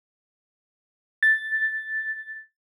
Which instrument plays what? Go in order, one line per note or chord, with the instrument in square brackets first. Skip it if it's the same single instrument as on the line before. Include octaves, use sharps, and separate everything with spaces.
[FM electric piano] A6